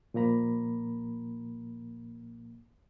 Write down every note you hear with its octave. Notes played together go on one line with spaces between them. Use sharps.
A#2 F3 A#3 A#5 B5